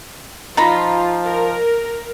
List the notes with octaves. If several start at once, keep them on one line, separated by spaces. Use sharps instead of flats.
F3 D#4 F4 A#5 B5
A#4